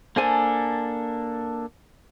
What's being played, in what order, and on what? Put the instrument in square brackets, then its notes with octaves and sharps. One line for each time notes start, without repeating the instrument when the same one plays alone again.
[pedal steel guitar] A#3 D4 A4 [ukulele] C5 G#5